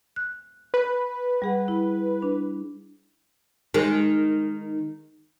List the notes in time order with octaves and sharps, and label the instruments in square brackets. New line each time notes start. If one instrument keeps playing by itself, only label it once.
[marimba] F#6
[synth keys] B4
[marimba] G3 G#4 F#5
E4
D4
[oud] D#3 G#3